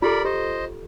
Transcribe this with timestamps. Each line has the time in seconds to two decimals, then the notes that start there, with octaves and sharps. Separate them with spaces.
0.02 F4 G4 A4 A#4 D5 B5
0.25 G4 C5 D#5